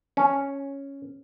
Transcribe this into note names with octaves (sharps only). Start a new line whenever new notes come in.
C#4